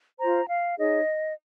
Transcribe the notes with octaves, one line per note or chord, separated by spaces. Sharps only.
F4 C5 A#5
F5
D#4 G#4 C#5 D#5